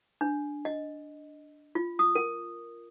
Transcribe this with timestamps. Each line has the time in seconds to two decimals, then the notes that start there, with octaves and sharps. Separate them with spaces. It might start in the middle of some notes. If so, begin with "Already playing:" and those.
0.21 D4
0.65 D#5
1.75 F4
1.99 D#6
2.15 A#4